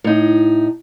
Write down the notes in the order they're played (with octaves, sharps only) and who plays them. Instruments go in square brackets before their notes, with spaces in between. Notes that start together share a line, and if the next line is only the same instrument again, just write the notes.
[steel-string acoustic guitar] A2 D#4